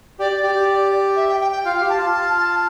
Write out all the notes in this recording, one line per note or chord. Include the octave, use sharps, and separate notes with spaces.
G4 D5
G4
G4
E5
G5
G5
G5
F4 F5
G4
A5
F4
A5
A5